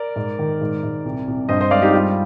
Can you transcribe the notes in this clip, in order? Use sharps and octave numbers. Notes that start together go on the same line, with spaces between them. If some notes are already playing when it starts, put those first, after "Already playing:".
Already playing: A#4 D5
G#2
D#3
G#2
G#2
C2
C2
G2 C5 D#5
C5 D#5
G#3 D5 F5
D#4 G4
G3 F4